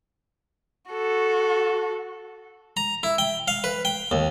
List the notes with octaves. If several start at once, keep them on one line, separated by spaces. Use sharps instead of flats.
F#4 A4
A#5
E4
G5
F5
B4
G5
D#2